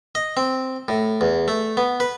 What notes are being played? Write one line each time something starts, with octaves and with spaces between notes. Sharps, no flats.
D#5
C4
A2
E2
A3
B3
B4